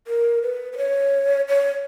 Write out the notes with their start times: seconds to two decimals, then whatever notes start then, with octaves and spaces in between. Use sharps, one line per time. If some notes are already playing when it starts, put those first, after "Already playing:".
0.07 A#4
0.43 B4
0.73 B4
0.77 C#5
1.48 C#5